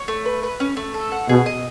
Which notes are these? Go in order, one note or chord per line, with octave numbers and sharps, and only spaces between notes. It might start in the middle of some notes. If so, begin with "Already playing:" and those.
Already playing: C#5
A3
B4
B4
C#4
A3
A4
F#5
B2 G#4
D#5